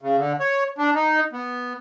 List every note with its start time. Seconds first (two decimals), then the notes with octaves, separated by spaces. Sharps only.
0.02 C#3
0.18 D3
0.40 C#5
0.78 D4
0.95 D#4
1.33 B3